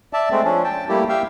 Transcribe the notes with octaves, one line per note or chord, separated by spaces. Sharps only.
D5 E5 A5
G#3 A3 C4
F3 C#4 D4
G5 A5
G3 A3 A#3 E4 G4
G4 E5 F5 G5 E6